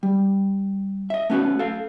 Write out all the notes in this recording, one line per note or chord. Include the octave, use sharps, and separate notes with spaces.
G3
D#5 E5
A3 B3 C#4 F4 F#4 B4
A4 F5